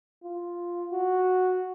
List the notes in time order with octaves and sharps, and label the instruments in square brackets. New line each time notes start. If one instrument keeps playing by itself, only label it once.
[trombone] F4
F#4